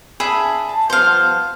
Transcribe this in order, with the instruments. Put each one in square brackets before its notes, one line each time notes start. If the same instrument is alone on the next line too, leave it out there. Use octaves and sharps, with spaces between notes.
[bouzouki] D4 [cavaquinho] G#4 E5 B5
[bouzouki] A5
[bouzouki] F3 G3 B3 [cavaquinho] C5 F5